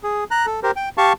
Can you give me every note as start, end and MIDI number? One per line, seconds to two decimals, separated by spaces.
0.03 0.24 68
0.31 0.46 82
0.31 0.46 90
0.46 0.60 69
0.63 0.71 67
0.63 0.71 70
0.63 0.71 72
0.76 0.89 79
0.98 1.13 67
0.98 1.13 77
0.98 1.13 81
0.98 1.13 85